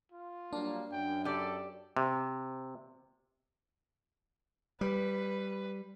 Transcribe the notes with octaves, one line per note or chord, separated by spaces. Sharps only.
F4
F#3 G3 A#3 D4
F#2 G5
G4 A4 D5
C3
G3 B4